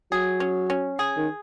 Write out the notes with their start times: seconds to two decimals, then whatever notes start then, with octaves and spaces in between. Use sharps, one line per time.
0.12 F#3 G#4
0.40 C#4
0.70 C#4
0.99 G#4
1.17 D#3